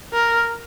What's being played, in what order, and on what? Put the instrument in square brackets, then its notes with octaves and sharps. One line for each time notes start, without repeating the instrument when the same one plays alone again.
[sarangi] A#4